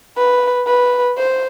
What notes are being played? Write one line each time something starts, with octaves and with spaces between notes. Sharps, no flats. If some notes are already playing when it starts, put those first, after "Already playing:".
B4
B4
C5